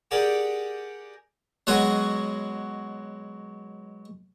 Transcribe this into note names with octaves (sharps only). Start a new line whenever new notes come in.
G4 G#4 A#4 D5 F#5 G5
B2 F#3 G#3 F#4 G#4